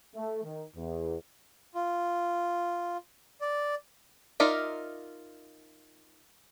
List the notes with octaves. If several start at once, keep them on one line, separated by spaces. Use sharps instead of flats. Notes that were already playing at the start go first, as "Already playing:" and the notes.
A3
D#3
E2
F4
D5
D#4 F4 A#4 D5 E5